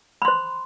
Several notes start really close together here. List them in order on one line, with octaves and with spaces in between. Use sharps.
B5 C6 C5